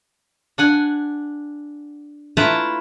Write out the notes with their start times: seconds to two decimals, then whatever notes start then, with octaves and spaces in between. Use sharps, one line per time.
0.58 D4 F#5 G#5
2.37 A3 E4 F4 B4 A5 A#5